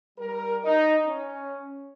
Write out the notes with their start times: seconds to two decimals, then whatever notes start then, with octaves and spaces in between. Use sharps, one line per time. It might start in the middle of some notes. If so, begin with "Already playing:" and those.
0.19 G3 A#4
0.64 D#4
1.06 C#4